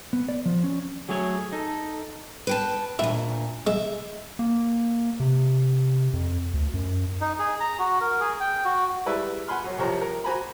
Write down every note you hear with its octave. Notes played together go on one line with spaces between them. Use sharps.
B3
D5
F3
C#4
F#3 A3 G#4 C#5
D#4 A4
B4 G5 A5
D2 A#2 E4
G#3 E5
A#3
C3
F2
D2
F#2
D#4
G#4
A#5
F#4
A#4
G#4
G5
F#4
G3 G#3 E4 B4 D5 E5
F#5 G#5 B5 C6 F6
F#2 C#5
C2 F2 C3 F3 C#5 A#5
A#4
F#4 C5 G#5 A#5 B5